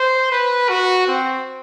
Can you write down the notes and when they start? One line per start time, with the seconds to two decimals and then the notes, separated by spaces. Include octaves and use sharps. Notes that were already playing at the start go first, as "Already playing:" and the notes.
Already playing: C5
0.32 B4
0.69 F#4
1.07 C4